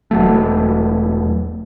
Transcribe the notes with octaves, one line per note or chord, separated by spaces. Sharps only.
E1 F#3 A3